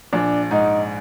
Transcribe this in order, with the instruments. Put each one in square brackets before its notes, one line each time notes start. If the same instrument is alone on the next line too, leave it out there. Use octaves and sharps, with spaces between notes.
[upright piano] A#1 [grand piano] D4
[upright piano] G#2 [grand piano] D#4